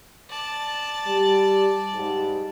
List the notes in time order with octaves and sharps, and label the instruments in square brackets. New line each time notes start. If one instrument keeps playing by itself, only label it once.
[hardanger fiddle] D5 A5
[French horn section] G3
G#2 G3